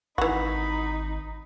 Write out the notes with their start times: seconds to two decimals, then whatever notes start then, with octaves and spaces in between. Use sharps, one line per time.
0.18 G#1 E3 D#4 F#4 B5